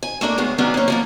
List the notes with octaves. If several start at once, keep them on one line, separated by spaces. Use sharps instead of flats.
G#5
A3 A#3 D4 A#4
A2 C#3 G#3 B3
D#3 F#3 B3 C#4 D4
A#3 C#4
F3 A#3 B3